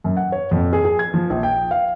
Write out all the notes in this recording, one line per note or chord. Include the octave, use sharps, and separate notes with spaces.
F#2
F#5
C#5
F2
G#4
G#4
G#6
F3
A#1
G5
F5